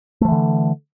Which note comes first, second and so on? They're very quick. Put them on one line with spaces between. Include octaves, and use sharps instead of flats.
A3 F3 E3 D3